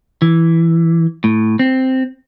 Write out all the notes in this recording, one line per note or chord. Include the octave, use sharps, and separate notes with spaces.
E3
A2
C4